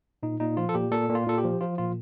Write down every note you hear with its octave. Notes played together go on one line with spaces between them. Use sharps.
A#2 D#4
A#2 D#4
F3 F4
A4
A#2 G4
A#2 A4
A#2
F4
A#2 A4
G4
F3
F3 F4
A#2 F4